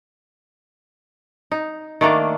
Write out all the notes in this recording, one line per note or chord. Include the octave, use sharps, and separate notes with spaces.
D#4
D#3 A3 A#3 D4